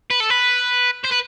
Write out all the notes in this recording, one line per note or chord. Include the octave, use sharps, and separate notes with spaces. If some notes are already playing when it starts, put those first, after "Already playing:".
B4
A4
B4
C5
B4